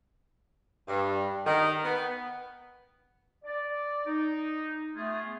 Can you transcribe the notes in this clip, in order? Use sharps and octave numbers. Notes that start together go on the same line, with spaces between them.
G2
D#3
B3
D5
D#4
A3 B3 F4 G#4